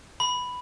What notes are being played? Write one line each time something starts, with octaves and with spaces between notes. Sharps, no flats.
B5